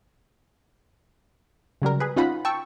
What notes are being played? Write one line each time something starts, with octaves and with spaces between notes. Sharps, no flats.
C#3 F#3 G3 A#4
G#4 B4
C#4 D#4 F4 F#5 B5
G5 A5 C#6 E6